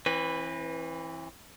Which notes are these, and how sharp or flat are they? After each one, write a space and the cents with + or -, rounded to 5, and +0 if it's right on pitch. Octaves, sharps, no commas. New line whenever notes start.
E3 +0 C4 +40 B4 +0